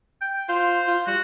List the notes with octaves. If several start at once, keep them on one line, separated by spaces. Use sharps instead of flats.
G5
F4 C5
F4
G3 F#4